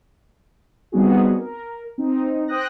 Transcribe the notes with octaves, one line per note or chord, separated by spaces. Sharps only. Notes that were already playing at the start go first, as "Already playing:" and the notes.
G3 B3 C4 D#4 F#4 G#4
A#4
C4 D#4
C5 G5 D#6 F#6 A#6